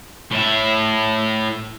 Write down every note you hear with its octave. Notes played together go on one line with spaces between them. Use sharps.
A2 E5